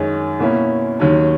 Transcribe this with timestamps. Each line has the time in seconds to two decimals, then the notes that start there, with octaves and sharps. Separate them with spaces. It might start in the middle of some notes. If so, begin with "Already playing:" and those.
Already playing: F#2 D#3 G#3 C#4
0.39 B2 A#3 C#4 E4
1.00 D#2 D#3 F#3 C#4